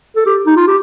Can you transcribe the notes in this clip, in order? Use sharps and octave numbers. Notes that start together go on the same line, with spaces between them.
A4
G4
D#4
F4
G4